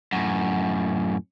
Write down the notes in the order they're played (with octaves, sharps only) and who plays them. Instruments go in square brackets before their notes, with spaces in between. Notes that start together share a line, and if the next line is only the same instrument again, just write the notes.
[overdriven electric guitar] F#2 A2